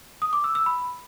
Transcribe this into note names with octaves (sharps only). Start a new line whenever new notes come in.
D#6
D6
E6
E6
B5